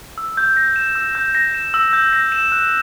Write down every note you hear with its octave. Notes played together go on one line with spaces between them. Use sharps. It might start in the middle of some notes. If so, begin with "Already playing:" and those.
E6
G6
A#6
E7
E6
G6
A#6
E7
E6
G6
A#6
E7
F#6